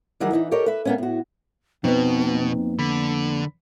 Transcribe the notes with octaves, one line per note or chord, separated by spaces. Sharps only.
D#3 E3 F#3 G3 G#4
E3 D#4 B4
G4 A4 A#4 C#5 D#5
B4 E5
A#3 B3 C#4
A2 F#4
F2 B2 B3 C4 D#4 B4
A#3
D3 B5 B6